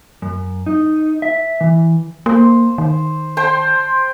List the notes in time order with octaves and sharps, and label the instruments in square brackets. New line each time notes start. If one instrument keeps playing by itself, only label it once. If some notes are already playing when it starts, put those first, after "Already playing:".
[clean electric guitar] F#2
D#4
E5
E3
[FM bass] A#3 [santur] C5
[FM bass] D#3
[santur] C5 G5 C6